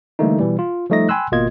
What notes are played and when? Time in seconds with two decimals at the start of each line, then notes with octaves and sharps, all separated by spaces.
0.19 D3 E3 G3 A3 A#3 D#4
0.39 B2 E3 G3
0.59 F4
0.90 F3 G3 A3 D#4 D#5 A#6
1.09 G5 G#5 B5 C6 E6 F#6
1.32 G#1 B2 A#3 F4 D#5 G#6